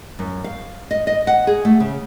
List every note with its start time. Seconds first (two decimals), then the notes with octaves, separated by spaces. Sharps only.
0.19 F#2
0.44 F5
0.91 D#5
1.07 D#5
1.27 F#5
1.47 G#4
1.65 A3
1.80 C#3